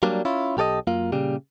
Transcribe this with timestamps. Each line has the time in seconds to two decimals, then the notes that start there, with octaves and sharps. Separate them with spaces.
0.03 F#3 G3 A#3 D4
0.25 C#4 E4 F4
0.57 B1 G4 A4 D5 D#5
0.87 F#2 A#3 F4
1.12 A#2 C#3 G3 G4